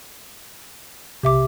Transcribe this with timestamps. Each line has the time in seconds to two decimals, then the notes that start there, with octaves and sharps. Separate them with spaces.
1.23 B1 C3 G4 E5 D6